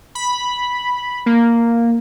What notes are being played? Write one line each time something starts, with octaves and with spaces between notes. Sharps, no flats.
B5
A#3